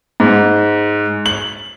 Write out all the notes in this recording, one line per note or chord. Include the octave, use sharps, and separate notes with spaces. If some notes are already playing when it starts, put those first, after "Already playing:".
G#2
F#7